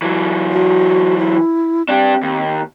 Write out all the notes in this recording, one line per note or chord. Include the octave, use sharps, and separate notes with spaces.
E3 F#3
F#4
E4
C4 D4 G4
D#2